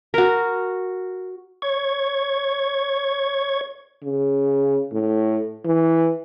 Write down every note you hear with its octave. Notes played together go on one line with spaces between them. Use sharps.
F#4 A#4
C#5 G#6
C#3
A2
E3